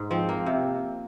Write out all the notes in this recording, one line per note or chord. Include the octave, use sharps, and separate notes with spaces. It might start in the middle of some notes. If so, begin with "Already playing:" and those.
Already playing: G#2 G#3
F3 C4
A#3
C3